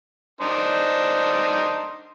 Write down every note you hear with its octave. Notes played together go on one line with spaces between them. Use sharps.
D4 D#4 C5